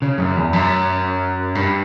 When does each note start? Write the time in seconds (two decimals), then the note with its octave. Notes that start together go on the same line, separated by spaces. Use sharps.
0.02 C#3
0.18 F#2
0.36 E2
0.53 F#2
1.55 G2